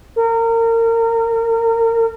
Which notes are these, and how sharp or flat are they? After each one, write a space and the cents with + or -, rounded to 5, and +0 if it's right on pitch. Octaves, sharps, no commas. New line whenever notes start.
A#4 -30